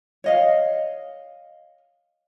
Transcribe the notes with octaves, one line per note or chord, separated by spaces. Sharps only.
C#5 D#5 F5